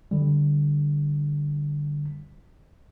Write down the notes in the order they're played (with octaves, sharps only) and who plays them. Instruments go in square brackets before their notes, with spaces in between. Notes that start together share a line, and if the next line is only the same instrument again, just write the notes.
[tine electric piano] D3 G3